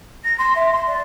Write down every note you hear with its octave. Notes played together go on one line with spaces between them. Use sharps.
A#6
C6
E5
C6
D5